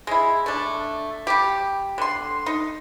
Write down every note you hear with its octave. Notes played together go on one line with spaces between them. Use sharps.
G#3 E4
A3 D4
G3 G4
D3 C6
D#4